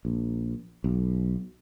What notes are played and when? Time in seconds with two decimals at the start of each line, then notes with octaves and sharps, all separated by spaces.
0.05 A#1
0.84 B1